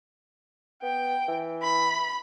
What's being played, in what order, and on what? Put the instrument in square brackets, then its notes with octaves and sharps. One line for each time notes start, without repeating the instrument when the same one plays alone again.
[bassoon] B3 [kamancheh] G5
[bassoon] E3
[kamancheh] B5